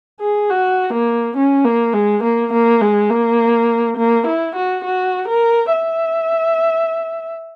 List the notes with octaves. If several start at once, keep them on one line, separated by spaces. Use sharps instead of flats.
G#4
F#4
A#3
C#4
A#3
G#3
A#3
A#3
G#3
A#3
A#3
E4
F#4
F#4
A#4
E5